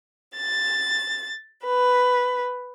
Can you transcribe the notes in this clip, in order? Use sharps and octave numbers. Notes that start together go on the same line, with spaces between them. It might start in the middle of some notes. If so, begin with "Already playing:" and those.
A6
B4